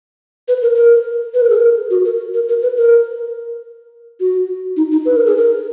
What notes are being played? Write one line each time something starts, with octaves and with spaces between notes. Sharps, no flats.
B4
A#4
A#4
B4
A#4
G#4
A#4
F#4
A#4
A#4
A#4
B4
A#4
F#4
D#4
D#4
B4
A#4
G#4
A#4